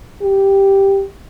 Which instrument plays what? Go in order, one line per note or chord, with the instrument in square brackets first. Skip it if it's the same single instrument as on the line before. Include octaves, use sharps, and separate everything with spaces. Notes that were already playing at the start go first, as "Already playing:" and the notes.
[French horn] G4